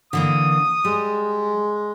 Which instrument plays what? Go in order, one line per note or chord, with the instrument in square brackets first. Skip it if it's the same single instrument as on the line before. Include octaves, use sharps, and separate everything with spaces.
[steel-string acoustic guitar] D3 E3 A#3 [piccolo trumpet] D#6
[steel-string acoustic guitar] G3 [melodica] G#3